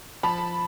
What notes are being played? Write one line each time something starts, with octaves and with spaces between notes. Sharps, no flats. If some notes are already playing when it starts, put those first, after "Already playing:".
F3 A5 B5